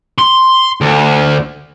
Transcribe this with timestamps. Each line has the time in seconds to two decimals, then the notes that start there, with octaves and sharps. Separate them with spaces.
0.18 C6
0.81 D2